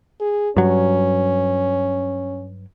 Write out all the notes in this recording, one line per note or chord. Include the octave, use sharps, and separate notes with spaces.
G#4
G2 F#3 C#4